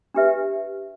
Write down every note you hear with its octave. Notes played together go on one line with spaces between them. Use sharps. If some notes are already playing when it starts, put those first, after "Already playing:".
D4 G4 B4 E5